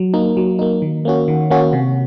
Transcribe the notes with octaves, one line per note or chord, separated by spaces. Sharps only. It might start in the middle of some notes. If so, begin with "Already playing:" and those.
Already playing: F#3
A#3 D#4
F#3
A#3 D#4
D#3
A#3 C#4 F#4
D#3
A#3 C#4 F#4
C3